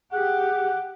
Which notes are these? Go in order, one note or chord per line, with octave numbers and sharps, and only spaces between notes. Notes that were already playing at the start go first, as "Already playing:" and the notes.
G4 G#4 F#5